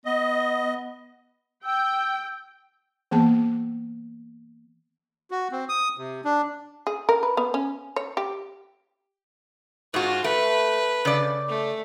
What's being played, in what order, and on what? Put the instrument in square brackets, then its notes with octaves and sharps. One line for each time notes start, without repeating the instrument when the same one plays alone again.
[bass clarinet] B3 [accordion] D#5
[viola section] G5 [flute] E6
[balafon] E3 A#3 B3 G#4 A5
[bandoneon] F#4
C4
D#6
C3
D4
[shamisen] G#4
A#4
B4
B3
C#4
C#5
G4
[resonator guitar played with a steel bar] G#2 F#4 [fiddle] F4
[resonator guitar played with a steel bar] A3 [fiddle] B4
[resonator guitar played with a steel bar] C#3 D5
[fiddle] A3